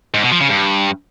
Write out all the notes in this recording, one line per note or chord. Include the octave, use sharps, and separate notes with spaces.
G#2
B2
F3
C#3
G2